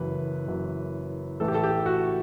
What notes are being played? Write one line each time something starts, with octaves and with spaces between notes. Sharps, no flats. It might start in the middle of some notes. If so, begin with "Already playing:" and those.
Already playing: F#1 F#2 E3 B4
F#1 F#2 E3
A1 A2 E3 A4
G4
A4
G4
F#4